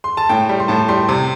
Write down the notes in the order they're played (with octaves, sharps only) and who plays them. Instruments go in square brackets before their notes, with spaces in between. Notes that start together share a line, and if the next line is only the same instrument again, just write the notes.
[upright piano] C6
A5
A2 G5
G3
C6
A2 A5
G3 C6
C3